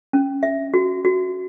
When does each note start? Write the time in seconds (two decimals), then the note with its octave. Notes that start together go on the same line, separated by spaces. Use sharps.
0.13 C#4
0.43 E5
0.74 F#4
1.05 F#4